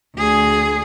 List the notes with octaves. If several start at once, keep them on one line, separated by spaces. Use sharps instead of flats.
D2 G#4